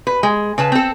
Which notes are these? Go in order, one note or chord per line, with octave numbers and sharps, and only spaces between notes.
B4
G#3
C#3 B4 A5
C4 A4